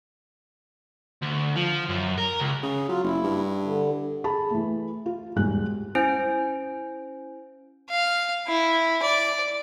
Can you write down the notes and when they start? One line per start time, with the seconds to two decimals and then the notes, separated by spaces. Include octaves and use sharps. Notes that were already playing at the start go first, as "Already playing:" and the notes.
1.22 D2
1.56 F3
1.89 F#2
2.18 A#4
2.40 C#2
2.63 C#3
2.89 F#3 F4
3.03 F#1 E4
3.24 G2
3.64 D3
4.24 G#4 A5 B5
4.51 E3 A3
5.06 F4
5.36 E1 G#2 G3 G#3 F#6
5.95 C#4 E4 C5 G#5 G6 D7
7.90 F5
8.48 E4
9.03 D5